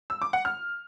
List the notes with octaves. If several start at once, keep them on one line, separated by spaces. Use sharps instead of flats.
E6
D6
F#5
F6